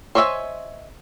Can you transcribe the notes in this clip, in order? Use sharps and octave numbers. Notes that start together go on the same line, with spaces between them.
C5 C#5 D#5 E5 G#5